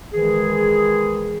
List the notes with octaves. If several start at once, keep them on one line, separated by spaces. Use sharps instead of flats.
D#3 E3 G#3 G#4